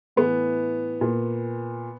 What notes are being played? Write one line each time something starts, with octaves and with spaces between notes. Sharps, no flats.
A2 E3 B3
A#2